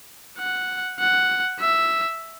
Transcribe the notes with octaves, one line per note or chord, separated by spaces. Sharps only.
F#5
F#5
E5